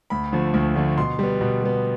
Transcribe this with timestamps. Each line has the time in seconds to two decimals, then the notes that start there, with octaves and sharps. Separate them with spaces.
0.10 D2 B5
0.32 D3 F3 A3
0.54 D2
0.75 D3 F3 A3
0.98 B2 C6
1.19 G3 B3
1.41 B2
1.62 G3 B3